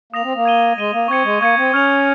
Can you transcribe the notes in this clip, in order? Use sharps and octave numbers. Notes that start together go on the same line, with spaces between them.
A#3 D#6 A#6 F7
C4
A#3
G#6 D#7 G7
G#3 G#6 D#7 G7
A#3
C4 C#6 G#6 C#7
G#3
A#3 C#6 G#6 C#7
C4
C#4 C#6 F6 G#6 C#7 F7